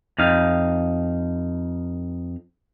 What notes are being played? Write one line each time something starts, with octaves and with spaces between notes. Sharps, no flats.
F2 D#4 F5